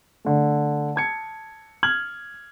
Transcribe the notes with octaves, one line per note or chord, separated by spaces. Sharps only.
D3 A3
A5 G#6 C#7
F6 G#6 F#7